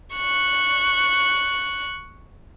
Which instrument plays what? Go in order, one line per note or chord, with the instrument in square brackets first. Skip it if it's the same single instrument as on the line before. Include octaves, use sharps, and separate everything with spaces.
[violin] C#6 F#6